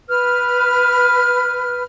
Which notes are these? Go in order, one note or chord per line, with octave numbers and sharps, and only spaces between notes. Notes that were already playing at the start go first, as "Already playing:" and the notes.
B4 F6